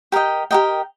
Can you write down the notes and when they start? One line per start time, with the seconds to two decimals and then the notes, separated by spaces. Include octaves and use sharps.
0.12 G4 A#4 D#5 G5
0.51 G4 A#4 D#5 G5